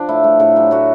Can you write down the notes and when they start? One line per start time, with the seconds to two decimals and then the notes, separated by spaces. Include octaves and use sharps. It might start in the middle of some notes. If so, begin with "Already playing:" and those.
Already playing: F3 D4
0.08 A2 E4
0.24 A3
0.40 A2 A4
0.56 F#3 G4
0.71 A2 F#4